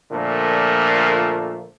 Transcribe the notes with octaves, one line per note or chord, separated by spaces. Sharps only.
A#2 D3 F3 A3 A#3